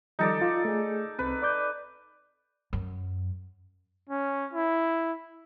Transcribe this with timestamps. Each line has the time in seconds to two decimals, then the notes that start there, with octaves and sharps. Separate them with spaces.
0.19 D#3 F3 G3 D#4 A4 D5
0.42 F4
0.65 A3 G#4
1.19 C2 C4 B4
1.42 D5 D6 G6
2.73 F#2
4.09 C#4
4.54 E4